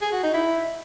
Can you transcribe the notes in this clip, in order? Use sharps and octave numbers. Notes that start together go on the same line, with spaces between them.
G#4
F#4
D#4
E4